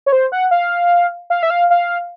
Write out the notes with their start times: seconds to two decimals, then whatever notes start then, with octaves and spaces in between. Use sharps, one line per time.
0.06 C#5
0.12 C5
0.32 F#5
0.51 F5
1.30 F5
1.43 E5
1.50 F5
1.70 F5